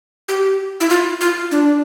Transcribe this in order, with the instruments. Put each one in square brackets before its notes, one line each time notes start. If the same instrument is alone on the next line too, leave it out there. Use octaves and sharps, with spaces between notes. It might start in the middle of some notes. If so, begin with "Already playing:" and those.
[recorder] G4
E4
F4
F4
D4